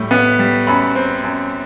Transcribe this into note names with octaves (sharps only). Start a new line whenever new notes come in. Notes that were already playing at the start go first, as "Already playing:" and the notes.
Already playing: A2 G3
B3
G3
F#2 B5
C4
F#2